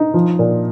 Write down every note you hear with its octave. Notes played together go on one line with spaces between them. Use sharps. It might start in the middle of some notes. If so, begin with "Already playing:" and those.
Already playing: D#4
F3
A#2